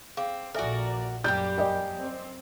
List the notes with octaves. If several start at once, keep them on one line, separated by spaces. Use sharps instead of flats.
C4 G#4 F5 D6
A#1 F3 F#4 A4 A#4 D5 E5 G#5
F#2 G3 A#3 G4 G6
A#4 D5 D#5 G5 G#5
C4